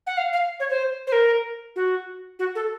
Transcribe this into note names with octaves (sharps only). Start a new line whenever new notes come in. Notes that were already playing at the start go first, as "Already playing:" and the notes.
F#5
F5
F5
C#5
C5
C5
A#4
F#4
F#4
A4